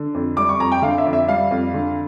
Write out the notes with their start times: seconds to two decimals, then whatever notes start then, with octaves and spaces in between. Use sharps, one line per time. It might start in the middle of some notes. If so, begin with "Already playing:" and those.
Already playing: D3
0.14 F2
0.37 G3 D6
0.49 C#6
0.59 F2 A#5
0.72 G5
0.82 D3 F5
0.98 E5
1.06 F2
1.13 E5
1.28 G3 F5
1.51 F2
1.74 D3